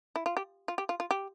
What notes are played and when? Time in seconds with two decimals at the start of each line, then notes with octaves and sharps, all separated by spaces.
0.16 E4
0.26 F4
0.37 G4
0.68 F4
0.78 G4
0.89 F4
1.00 F4
1.11 G4